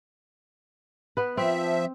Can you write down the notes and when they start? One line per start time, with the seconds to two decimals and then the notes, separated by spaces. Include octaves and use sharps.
1.17 B3 B4
1.37 F3 C4 E5